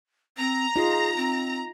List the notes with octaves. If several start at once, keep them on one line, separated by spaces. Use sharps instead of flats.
C4 A#5
D#4 F4 G#4
C4